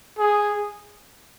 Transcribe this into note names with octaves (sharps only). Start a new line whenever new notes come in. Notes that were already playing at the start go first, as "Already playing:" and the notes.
G#4